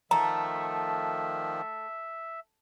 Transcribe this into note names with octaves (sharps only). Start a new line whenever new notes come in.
D#3 F3 A3 E5 A#5